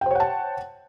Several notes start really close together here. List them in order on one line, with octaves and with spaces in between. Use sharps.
G5 C5 C#5 F#5 A5